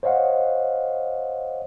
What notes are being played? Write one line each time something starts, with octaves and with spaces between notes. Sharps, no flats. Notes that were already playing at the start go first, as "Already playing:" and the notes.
C5 C#5 D#5 F5 F#5